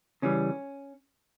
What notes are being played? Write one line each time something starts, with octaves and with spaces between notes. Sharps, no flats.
C#3 E3 G3 C#4